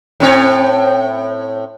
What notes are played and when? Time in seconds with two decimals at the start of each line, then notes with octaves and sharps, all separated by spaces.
0.20 A2 C4 C#5